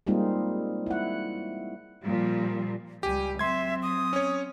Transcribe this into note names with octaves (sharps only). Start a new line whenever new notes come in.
G3 G#3 A#3 C4 D#4 F4
E4 F#5
A#2 F3 G3
C#2 G3 G4 G#5
F#3 C4 E5 C6 G#6
D#6
C#4 C#5